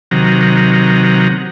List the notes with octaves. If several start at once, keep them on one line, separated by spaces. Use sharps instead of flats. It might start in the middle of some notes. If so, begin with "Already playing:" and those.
C3 D#3 F#3 A#5